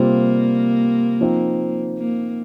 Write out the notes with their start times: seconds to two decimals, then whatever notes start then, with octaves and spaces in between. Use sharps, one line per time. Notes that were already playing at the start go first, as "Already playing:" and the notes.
Already playing: C3 G3 A#3 C4 F4
1.21 F3 C4 D#4
1.98 A#3